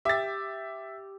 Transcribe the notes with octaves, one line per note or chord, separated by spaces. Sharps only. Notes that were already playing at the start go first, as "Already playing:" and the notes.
G4 E5 A6